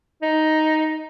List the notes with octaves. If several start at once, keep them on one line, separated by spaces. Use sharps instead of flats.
D#4